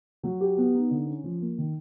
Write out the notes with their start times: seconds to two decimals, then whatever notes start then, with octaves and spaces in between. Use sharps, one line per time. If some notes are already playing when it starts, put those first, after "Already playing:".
0.23 F#3
0.41 G4
0.57 B3
0.74 D#4
0.91 D3
1.07 C#4
1.24 F3
1.41 A#3
1.58 D#3